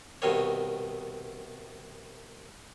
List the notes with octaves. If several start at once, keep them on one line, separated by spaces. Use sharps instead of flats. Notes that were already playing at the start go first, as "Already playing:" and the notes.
C2 B2 D#3 C#5